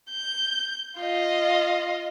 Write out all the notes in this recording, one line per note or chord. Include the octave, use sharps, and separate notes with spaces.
G6
F4 D#5